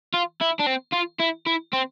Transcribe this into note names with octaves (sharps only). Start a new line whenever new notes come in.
F4
E4
D4
C4
F4
E4
E4
C4